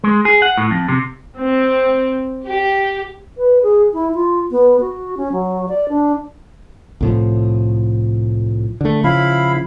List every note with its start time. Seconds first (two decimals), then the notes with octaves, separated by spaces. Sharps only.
0.04 G#3
0.25 G#4
0.42 F#5
0.58 A2
0.71 F2
0.88 C3
1.38 C4
2.46 G4
3.38 B4
3.63 G#4
3.93 E4
4.14 F4
4.51 B3
4.81 F#4
5.17 C#4
5.32 F#3
5.69 D5
5.89 D4
7.01 C2 A2 F3
8.81 D3 A3
9.04 C#3 F3 E4 F5 B5